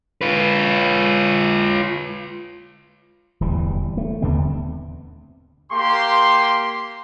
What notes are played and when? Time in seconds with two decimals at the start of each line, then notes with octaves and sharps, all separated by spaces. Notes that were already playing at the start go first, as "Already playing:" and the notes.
0.21 F4 B4
3.40 D1 E2 E3 G3
3.97 A3
4.22 D#2 D3 B3 C4
5.71 A#3 G4 C6